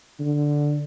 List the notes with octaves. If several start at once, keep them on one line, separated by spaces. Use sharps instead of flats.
D3